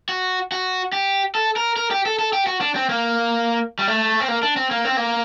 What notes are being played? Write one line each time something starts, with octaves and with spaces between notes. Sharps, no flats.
F#4
F#4
G4
A4
A#4
A#4
G4
A4
A4
G4
F#4
D4
C4
A#3
G3
A3
C4
A#3
D4
C4
A#3
C4
A#3